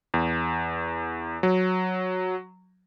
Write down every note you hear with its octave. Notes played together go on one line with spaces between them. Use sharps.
E2
F#3